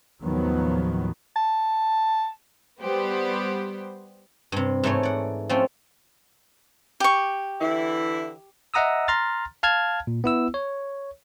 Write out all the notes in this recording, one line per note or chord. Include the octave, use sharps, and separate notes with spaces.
D#2 A2 D#3 F3 F#3 B3
A5
G3 B3 G4 C5
G2 C3
G#2 E3 A3 C#5
D5 F#5
F3 A3 C4 C#4
G4 C#6
D3 E3 E4
D#5 E5 F#5 A#5 D#6 E6
A#5 C6 F6 A6
F5 A5 F6 G#6
A#2
B3 E4 E6
C#5